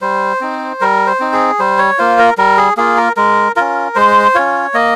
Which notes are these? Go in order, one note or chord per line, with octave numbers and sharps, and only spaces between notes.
G3 C5
C4 D#4
G3 A#4
C5
C4 D#4
G#4
G3 C5
C#5
A#3 F4 C5
A#4
G3 A#4
G#4
A#3 F4 G#4
A#4
G#3 A#4
C#4 F4 A#4
G#3 C5
C#4 F4 C#5
A#3 D#5